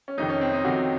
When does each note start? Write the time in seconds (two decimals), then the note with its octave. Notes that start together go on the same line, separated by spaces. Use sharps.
0.08 C#4
0.18 F2 C3 D#3 D#4
0.29 C#4
0.41 C4
0.53 D#4
0.64 F2 C3 D#3 F#4